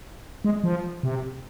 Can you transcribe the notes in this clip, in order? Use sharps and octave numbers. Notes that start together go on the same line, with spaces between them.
G#3
F3
C3